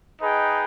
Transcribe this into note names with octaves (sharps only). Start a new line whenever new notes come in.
D#4 G#4 B4 D#5 G5